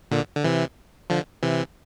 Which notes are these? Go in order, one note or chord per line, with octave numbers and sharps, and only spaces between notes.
A#2 D3
D3
C3 E3
D3 F3
C3 E3